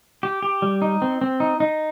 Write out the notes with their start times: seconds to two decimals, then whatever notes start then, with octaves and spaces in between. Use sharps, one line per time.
0.23 G4
0.42 G4
0.62 G3
0.82 D#4
1.02 C4
1.21 C4
1.40 D#4
1.60 D#4